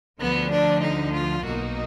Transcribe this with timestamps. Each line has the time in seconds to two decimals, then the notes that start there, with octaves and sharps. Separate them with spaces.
0.20 D2 D3 F3 B3
0.51 D4
0.83 D#4
1.14 F4
1.45 B1 B2 A#3 D#4 F#4